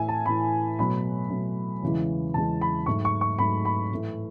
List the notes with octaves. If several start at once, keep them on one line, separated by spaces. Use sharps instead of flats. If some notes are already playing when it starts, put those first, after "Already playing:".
Already playing: A2 E3 A3 E5 G#5
A5
A2 E3 A3 B5
B2 F#3 A3 B5
B2 F#3 A3
E2 C#3 E3 G#3
E2 C#3 E3 G#3 A5
B5
G#2 F#3 A3 C#6
C#6
C#6
G#2 F#3 A3 B5
B5
A2 E3 A3